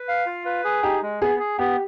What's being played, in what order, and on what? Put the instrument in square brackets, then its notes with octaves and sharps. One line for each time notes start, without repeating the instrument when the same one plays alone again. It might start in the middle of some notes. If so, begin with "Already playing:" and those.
Already playing: [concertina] B4
F5
F4
B4
G#4
[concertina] D#4 [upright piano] G4
[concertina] G#3
[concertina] B3 [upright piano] G#4
[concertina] G#4
[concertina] B3 [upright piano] G4